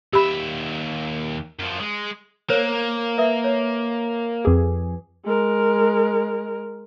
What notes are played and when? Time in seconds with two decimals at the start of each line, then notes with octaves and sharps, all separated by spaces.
0.13 D#2 G4 E5 B5
1.59 F#2 F3
1.80 G#3
2.50 A#3 A#4 C5 C#5
3.18 B4 E5 D#6
3.44 C#5
4.45 F2 G#4 B4 D6
5.25 G#3 A#4